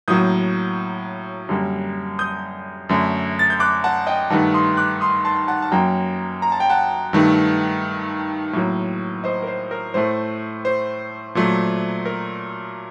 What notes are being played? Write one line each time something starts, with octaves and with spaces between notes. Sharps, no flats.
A2 F#3 A#3 D#6 G6
F#2 D3 G3 A#3
D#6 G6
F#2 D3 A3
A6
G6
D6 F#6
F#5 A5
D#5 G5
G2 D#3 A3 F#5 A5
C6 D#6
D6 F#6
C6 D#6
A5 C6
F#5 A5
A5
F#2 F#3 A#3 G5 A#5
A#5
A5
G5
F#5 A5
G2 D#3 A3
A2 F#3 A#3
C5 D#5
A#4
C5
A#4
A2 A3 C5
C5
A#2 F#3 A3
A#4